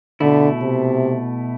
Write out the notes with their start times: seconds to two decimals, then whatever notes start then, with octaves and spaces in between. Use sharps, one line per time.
0.21 B2 D3 A3 E4
0.62 C3